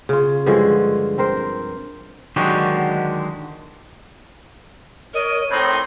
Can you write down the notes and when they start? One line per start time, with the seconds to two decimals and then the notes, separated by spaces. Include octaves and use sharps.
0.09 C#3 F4
0.46 G2 D3 F3 G#3
1.18 C4 A#4 C5
2.36 D3 D#3 F#3 G#3 F#4 G4
5.14 A#4 C#5 D#5
5.51 A2 C4 D#4 B5 C6